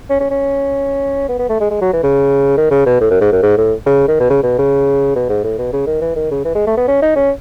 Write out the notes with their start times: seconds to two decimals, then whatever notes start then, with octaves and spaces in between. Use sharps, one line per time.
0.10 C#4
0.20 C#4
0.31 C#4
1.28 B3
1.39 B3
1.49 A3
1.60 G#3
1.71 G#3
1.81 F#3
1.93 E3
2.03 C#3
2.57 D#3
2.71 C#3
2.86 B2
3.01 A2
3.11 F#2
3.21 G#2
3.32 F#2
3.43 G#2
3.57 A2
3.86 C#3
4.08 D#3
4.20 B2
4.30 C#3
4.43 B2
4.58 C#3
5.16 B2
5.29 G#2
5.44 A2
5.58 B2
5.73 C#3
5.87 D#3
6.01 E3
6.16 D#3
6.31 C#3
6.45 E3
6.55 G#3
6.67 A3
6.77 B3
6.88 C#4
7.02 D#4
7.16 C#4